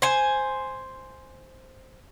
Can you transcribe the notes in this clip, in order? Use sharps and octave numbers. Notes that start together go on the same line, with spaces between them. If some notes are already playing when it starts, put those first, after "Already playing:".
C5 G#5